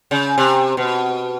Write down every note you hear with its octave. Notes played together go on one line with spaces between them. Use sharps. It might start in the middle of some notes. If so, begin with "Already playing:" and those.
C#3
C3
B2